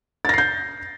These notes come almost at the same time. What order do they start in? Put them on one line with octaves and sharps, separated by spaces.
A6 A#6 C7 G6